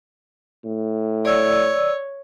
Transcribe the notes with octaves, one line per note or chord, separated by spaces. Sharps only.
A2
C#5 D5 E6